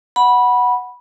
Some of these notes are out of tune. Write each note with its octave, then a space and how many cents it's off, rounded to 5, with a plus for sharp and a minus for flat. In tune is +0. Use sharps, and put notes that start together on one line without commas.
F#5 +0 B5 -15